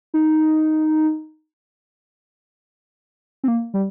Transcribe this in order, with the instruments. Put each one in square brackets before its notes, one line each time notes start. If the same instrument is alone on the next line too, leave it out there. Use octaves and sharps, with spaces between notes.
[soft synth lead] D#4
C4
A#3
G3